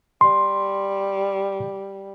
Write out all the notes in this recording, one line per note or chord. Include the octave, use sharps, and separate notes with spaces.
G3 C6